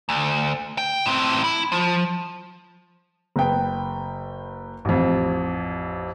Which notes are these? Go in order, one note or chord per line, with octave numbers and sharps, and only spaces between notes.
D2
G5
A2 C4
E4
F3
F#1 B4 G5
A1 F2